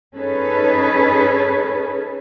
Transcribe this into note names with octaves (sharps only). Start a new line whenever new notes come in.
C#4 D#4 G#4 A4 B4